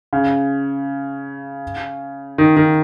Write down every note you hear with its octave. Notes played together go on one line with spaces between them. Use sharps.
C#3
D#3
D#3